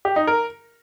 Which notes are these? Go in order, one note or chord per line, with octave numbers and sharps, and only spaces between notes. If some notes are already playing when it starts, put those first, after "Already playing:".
G4
D#4
A#4